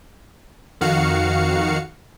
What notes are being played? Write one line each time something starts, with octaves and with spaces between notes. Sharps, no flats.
F2 D#3 F#4 F5 C#7